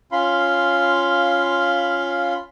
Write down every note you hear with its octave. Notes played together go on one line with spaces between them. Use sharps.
C#4 F4 F5 B5 C6